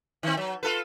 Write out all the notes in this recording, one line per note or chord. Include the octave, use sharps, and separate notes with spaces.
D#3 C4
F#3
F4 A4 B4